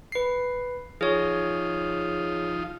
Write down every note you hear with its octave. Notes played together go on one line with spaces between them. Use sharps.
B4 C7
F3 D#4 F4 G#4 C#5